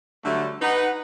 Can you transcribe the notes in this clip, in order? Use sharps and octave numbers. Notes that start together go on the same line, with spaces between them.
D3 F#3 G3 A3
D#4 B4 F#5